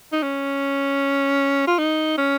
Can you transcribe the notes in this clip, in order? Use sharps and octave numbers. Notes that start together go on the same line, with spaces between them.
D#4
C#4
F4
D#4
C#4